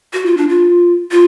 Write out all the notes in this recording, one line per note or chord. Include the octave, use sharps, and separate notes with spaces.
F#4
F4
D4
F4
F4